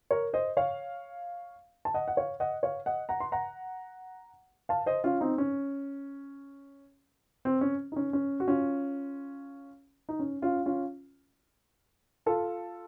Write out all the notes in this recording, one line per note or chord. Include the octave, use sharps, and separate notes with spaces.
A#4 C#5
C5 D#5
C#5 F5
A5
D#5 F#5
F#5
C#5 F5
D#5 F#5
C#5 F5
D#5 F#5
F#5 A#5
C6
F#5 A#5
F5 A5
C5 D#5
C#4 F4
C4 D#4
C#4
C4
C#4
D#4
C#4
C#4
F#4
C#4 F4
D#4
C#4
C#4 F4
C#4 F4
F4 A4